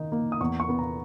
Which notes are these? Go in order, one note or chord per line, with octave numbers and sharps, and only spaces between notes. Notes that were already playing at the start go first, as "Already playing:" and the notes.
Already playing: D#3 D#4
A#3
D#6
E2 C#6
C#6
B3
A#5